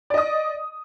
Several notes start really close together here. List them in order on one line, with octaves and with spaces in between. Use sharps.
D5 D#5 D#6